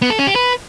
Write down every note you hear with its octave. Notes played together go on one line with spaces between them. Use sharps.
B3
A4
C#4
G4
B4